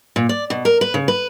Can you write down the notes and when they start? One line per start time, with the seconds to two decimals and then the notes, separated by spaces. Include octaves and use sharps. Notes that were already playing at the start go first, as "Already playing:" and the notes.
0.16 A#2
0.29 D5
0.50 B2
0.65 A#4
0.81 B4
0.94 C#3
1.08 B4